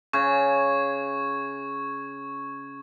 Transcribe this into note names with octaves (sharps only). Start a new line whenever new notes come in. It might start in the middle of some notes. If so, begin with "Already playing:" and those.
C#3 C#6 G#6